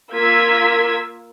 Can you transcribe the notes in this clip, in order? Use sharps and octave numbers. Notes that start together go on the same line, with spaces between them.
A#3 F4 E6 G#6 B6